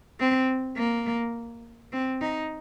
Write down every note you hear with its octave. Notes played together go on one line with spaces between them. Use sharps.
C4
A#3
C4
D#4